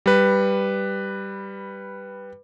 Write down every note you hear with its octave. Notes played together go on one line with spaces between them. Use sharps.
G3 B4